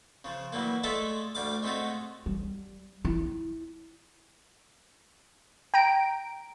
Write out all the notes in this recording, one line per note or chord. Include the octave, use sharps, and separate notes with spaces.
C#3 F3
E3 F#3 G3 A#3
G#3 A3 F4 A4 D5 E5
D2 G3 F5 D6
G#3 A3 C4 F4 F#4
G3
E4
G5 A#5 D7